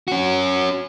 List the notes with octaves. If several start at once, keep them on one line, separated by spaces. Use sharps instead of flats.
C#4 F#4